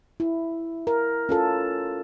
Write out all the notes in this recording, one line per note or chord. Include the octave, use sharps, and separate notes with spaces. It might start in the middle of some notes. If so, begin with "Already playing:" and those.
E4
A#4
C#4 F4 A4